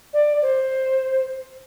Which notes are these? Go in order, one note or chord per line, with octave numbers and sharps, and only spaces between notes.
D5
C5